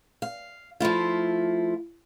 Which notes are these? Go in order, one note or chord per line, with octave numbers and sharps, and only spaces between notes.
F5
F3 A3 E4 F4